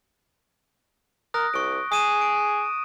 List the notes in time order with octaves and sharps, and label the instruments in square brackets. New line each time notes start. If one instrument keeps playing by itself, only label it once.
[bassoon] A#4 [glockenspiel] D#6 F#6 A#6
[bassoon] C2 [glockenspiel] C#6 D7
[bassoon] G#4 [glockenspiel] D#6 D#7 E7
[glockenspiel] D7